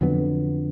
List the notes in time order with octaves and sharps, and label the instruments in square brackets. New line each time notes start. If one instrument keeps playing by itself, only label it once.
[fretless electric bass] F2 D3 F#3 B3